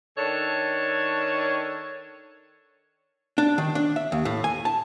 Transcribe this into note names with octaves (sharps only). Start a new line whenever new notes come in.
D#3 D4 A4 C#5
D4
D#3
D4
E5
D#2
A2
G#5
A5